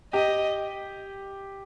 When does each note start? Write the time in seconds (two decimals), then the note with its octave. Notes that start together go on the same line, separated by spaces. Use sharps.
0.13 G4 D#5